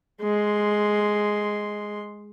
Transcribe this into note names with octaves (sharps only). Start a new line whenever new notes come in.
G#3 C6